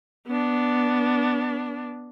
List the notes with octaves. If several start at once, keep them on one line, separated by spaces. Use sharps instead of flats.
B3 D4